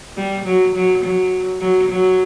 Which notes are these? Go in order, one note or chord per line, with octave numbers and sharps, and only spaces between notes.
G3
F#3
F#3
F#3
F#3
F#3